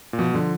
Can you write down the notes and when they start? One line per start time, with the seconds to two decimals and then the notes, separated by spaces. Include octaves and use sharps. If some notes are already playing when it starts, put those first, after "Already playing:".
0.13 A#2
0.19 B2 F3
0.34 D3 F3